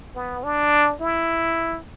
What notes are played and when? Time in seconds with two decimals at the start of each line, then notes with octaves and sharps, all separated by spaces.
0.16 B3
0.43 D4
1.01 E4